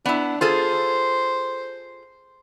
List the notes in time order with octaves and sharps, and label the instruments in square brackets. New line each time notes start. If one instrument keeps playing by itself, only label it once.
[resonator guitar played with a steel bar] B3 E4 [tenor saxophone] D4
[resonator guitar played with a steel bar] F4 G#4 A4 [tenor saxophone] C5